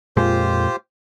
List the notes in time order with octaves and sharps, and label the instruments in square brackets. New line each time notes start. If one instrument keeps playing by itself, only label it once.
[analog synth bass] F2 [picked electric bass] A#2 G#3 [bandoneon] F4 G4 C5